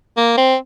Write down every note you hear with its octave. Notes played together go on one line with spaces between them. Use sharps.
A#3
C4